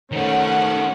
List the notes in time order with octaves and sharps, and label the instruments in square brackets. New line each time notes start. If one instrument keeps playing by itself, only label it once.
[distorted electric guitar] D#3 A3 [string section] C#4 C5 F#5